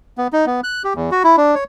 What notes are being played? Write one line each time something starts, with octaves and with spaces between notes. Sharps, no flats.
B3
D#4
B3
F#6
G4
E2
F#4
E4
D4
C#5